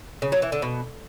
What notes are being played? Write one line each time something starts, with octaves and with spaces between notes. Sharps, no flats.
C#3
F#3
E3
D3
B2